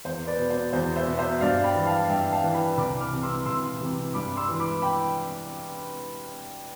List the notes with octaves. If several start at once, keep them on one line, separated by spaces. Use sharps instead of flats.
E2 C5
B4 D5
B2
C5
E2 C5
C5 E5
B2
C5 E5
G2 D5 F5
G5 B5
E3
F5 A5
G2 E5 G5
F5 A5
E3
G5 B5
C2 B5 D6
D6 F6
C3 E3
C6 E6
C2 C6 E6
C3 E3
G2 B5 D6
C6 E6
E3
B5 D6
G5 B5